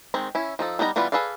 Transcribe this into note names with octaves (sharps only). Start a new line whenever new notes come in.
D#3 G#3 C4
C#4 E4
F3 D#4 A4
G3 B3 D#4 D5 A#5
E3 G3 B3 F4 D5
G#4 A4 B4 D5 F5